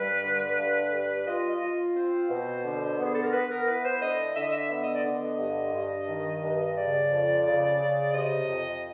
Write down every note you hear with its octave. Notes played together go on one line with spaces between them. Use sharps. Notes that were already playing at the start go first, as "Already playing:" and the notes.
Already playing: G2 G3 B4
D3
G2
G3
F4 D#5
D#5
F4
C4 C5
B2
D3
B3
G#4
A4
A#4
B3 B4
A#4
E4 B4
C5
D3 D#5
D3 E5
D#5
E5
B3 E5
D#5
D5
D3 D#5
G2
G2
D#3
G2
C#3 D5
F2
C#3
C#3
C3 D#5
F2